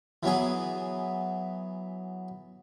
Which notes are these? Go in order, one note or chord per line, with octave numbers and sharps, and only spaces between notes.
E3 F#3 B3 G#4